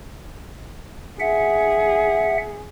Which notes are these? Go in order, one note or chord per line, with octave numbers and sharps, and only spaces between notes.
G#4 E5 F#5